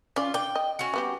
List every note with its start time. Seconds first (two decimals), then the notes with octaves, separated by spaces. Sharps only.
0.16 C#4 F4 D5
0.34 D4 D5 G5
0.56 D#5
0.79 C#4 F#4
0.94 G3 B3 G4